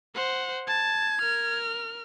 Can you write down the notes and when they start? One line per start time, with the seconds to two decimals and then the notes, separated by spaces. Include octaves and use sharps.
0.15 C5 F#5
0.67 A5 G#6
1.21 A#4 F6